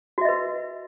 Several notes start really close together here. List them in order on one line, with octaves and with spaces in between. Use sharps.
F#4 E5 D#5 B4